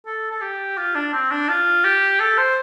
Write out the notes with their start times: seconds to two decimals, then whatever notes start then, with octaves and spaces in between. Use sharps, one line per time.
0.06 A4
0.31 A4
0.42 G4
0.77 F4
0.95 D4
1.13 C4
1.31 D4
1.49 F4
1.84 G4
2.20 A4
2.38 C5